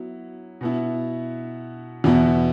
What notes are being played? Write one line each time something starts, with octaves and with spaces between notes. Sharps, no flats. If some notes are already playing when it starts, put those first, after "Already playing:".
Already playing: F#3 B3 E4
B2 B3 E4
E2 B2 B3 E4